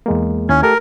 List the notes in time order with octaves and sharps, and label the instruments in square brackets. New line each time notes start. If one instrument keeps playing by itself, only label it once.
[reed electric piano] E2 G#3 A#3
[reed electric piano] D#2 E4 G#6 [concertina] C#4
[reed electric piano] A3 G4 A4 [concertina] A#4